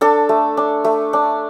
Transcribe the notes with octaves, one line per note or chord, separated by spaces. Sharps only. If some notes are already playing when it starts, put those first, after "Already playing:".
D4 A4
A3
D4
A3
D4